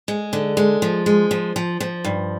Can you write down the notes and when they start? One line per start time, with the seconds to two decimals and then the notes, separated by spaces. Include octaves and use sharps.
0.08 G#3
0.33 D3
0.57 G#3
0.82 F3
1.06 G#3
1.31 F3
1.56 F3
1.80 F3
2.05 G2